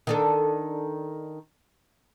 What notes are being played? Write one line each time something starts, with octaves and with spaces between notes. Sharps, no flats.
D#3 D4 A4